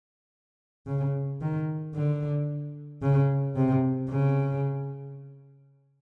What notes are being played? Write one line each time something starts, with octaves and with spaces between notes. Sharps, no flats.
C#3
D#3
D3
C#3
C3
C#3